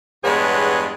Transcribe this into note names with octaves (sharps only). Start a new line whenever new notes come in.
E2 G2 G#3 B3 G#4 C#5